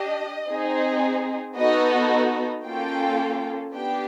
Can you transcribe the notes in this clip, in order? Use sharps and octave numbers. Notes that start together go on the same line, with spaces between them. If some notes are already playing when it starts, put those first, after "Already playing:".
Already playing: D4 G4 D#5
C4 D#4 G#4
B3 D#4 F#4 A4 D#5
A#3 C#4 F4 A4 G5
B3 D4 G4 G5